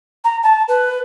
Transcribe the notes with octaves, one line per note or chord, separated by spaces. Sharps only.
A#5
A5
B4